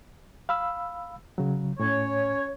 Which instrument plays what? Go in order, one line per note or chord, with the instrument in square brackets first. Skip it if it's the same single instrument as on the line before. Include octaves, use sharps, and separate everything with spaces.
[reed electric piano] F5 B5 E6
C#3 F#3
[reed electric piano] A2 [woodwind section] C#4 C#5